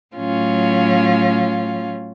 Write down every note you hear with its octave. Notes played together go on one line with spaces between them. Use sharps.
A2 F#3 C#4 F4